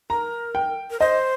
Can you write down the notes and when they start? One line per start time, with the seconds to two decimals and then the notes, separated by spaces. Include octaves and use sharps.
0.10 A#4 A#5
0.55 G5
0.91 A#4
1.00 C5 D#5